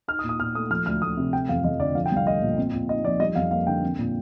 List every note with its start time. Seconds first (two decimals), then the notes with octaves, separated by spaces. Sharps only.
0.08 D#4 F6
0.19 D#6
0.24 A#2
0.29 D#6
0.40 A#2 F6
0.55 A3 D#6
0.70 F3 F6
0.86 D2 F6
1.02 D2 D#6
1.17 C3
1.33 A3 G5
1.49 F2 F5
1.64 F2 D#5
1.80 D3 D5
1.95 F3 F5
2.06 G5
2.12 C2 F5
2.27 A3 D#5
2.42 A#2
2.58 C4
2.73 A#2
2.89 D#4 D#5
3.05 F3 D5
3.20 G3 D#5
3.35 F2 F5
3.51 A#3 F5
3.67 D3 G5
3.83 C4
3.99 A#2